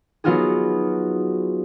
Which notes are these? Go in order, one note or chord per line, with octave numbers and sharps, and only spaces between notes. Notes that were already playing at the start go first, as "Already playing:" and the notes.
F#3 B3 D#4 F4 F#4 G#4